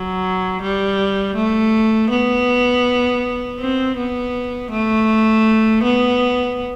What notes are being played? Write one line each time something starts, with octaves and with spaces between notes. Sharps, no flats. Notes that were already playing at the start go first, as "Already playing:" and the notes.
Already playing: F#3
G3
A3
B3
C4
B3
A3
B3